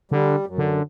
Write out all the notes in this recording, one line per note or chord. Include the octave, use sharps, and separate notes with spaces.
D3 G3
F#2
D3